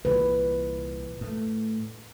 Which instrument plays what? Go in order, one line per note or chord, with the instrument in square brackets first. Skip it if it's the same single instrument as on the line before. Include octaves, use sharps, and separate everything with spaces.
[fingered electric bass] C2 A#2 E3 [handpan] B4
[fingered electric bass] A2 A3